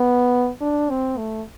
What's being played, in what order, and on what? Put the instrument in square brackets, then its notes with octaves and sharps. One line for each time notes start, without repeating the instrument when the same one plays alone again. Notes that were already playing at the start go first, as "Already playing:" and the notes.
Already playing: [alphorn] B3
D4
C4
A3